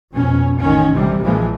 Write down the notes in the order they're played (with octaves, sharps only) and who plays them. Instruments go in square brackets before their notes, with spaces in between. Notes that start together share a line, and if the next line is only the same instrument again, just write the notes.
[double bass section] F2 B2 C#4
A1 D#3 C#4
A1 C3 G3
A#1 A#2 E3 F3 G#3 A#3